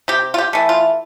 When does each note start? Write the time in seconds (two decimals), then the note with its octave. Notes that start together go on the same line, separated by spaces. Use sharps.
0.08 C3 G4
0.34 F4
0.38 G4
0.53 E3 A3
0.69 F4